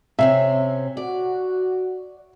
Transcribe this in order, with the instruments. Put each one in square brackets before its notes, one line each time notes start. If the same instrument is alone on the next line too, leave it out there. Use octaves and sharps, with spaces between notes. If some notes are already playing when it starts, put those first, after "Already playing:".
[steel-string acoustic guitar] C3 C4 C#4 [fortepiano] E5
[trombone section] F#4 [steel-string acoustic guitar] D5